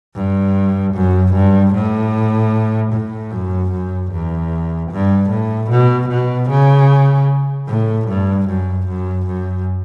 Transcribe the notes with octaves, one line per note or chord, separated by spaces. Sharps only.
G2
F#2
G2
A2
A2
F#2
F#2
E2
G2
A2
B2
B2
C#3
A2
G2
F#2
F#2
F#2